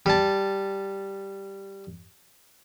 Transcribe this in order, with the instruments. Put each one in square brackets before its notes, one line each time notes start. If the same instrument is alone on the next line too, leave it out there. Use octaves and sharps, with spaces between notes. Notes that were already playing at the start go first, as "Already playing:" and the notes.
[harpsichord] G3 A5